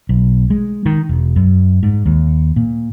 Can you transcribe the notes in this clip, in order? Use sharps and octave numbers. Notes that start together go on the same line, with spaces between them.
B1
G#3
D#3
E1
F#2
G#2
D#2
A#2